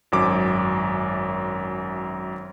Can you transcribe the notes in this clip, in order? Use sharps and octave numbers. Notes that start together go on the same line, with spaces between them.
G#1 F#2 D6